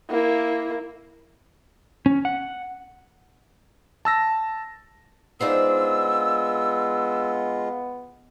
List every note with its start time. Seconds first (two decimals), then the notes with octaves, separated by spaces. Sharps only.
0.10 A#3 E4
2.06 C#4
2.25 F#5
4.05 A5 E6 A#6
5.41 G#3 B3 D4 D#4 F4 C5 E6